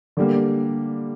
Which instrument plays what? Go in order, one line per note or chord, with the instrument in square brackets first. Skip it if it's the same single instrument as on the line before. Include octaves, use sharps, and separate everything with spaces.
[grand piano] D3 G3 A#3